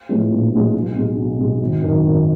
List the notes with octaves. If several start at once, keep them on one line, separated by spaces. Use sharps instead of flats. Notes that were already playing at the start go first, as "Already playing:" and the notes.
A2 F3 G#3 B3
A#1
A2 F3 G#3 B3
B1
B2 G#3
B1
B2 G#3
G#1
F#2 D#3
G#1